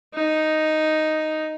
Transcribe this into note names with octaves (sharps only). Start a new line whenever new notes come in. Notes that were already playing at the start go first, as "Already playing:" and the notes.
D#4